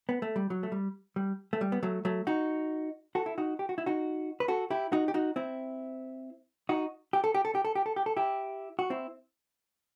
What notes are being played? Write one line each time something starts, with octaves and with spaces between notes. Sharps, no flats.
B3
A3
G3
F#3
A3
G3
G3
A3
G3
B3
F#3 A3
F#3 A3
D#4 F#4
F#4 A4
E4
D#4 F#4
G4
F#4
E4
D#4 F#4
B4
F#4 A4
E4 G4
D#4 F#4
G4
D#4 F#4
C4 E4
D#4 F#4
G4
A4
G4
A4
G4
A4
G4
A4
G4
A4
E4 G4
F#4
C4 E4